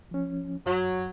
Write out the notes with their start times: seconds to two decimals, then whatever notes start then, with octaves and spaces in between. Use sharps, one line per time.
0.11 F3 C#4
0.66 F#2 F#3